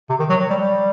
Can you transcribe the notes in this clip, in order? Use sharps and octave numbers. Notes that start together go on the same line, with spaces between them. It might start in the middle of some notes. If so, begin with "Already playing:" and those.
C3
D#3
F#3
F#3
G3
G3